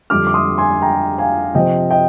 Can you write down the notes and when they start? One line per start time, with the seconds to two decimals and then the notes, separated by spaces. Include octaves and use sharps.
0.10 F2 D3 G3 D4 D6 F6
0.27 D6
0.34 C6 D#6
0.58 G#5 C6
0.82 G5 A#5
1.18 F5 G#5
1.55 C3 F3 C4 D#5 G5
1.91 D#5 G5